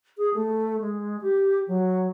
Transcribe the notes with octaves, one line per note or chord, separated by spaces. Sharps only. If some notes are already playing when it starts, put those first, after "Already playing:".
G#4
A3
G#3
G4
F#3